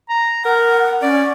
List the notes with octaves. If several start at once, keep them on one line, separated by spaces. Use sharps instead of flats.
A#5
A#4 F#5
C#4 D5